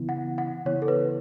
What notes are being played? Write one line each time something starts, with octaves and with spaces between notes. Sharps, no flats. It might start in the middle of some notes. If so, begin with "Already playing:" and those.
Already playing: C#3 E3 B3 E4
F#5
F#5
C#3 E3 B3 E4 C#5
A4
B4